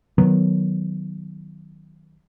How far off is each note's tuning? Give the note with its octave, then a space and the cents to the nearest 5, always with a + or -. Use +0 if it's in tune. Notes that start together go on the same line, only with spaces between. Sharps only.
D#3 +0 F#3 +0 B3 +0